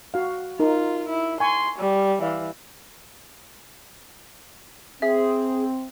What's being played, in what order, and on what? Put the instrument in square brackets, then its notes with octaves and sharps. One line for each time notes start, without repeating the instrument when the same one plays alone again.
[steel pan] F#4 F5
[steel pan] D#4 A#4 [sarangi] F4
[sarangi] E4
[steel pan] G#5 C#6 [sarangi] C6
[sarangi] G3
[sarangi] E3 [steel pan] D5 F5
[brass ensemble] C4 [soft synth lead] G#4 [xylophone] E5